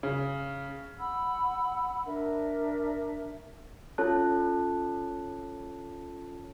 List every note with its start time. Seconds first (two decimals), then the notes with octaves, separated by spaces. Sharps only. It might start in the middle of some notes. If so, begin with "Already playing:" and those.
0.03 C#3
0.99 F#5 B5 E6
2.05 D4 A#4 E5
3.98 C#4 F4 A4 C#5 A5 F#6